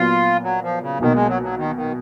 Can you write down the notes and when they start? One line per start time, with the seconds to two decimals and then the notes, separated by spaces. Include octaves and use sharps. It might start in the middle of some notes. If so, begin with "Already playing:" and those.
Already playing: A#2 F#3 B3 F4
0.43 F#3
0.62 F3
0.81 C#3
1.00 B1 B2 D#3 A#3
1.15 G#3
1.28 F#3
1.42 F#3
1.57 D#3
1.76 D#3